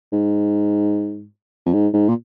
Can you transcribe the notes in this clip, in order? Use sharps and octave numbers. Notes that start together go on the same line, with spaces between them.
G#2
F2
G#2
G#2
A#2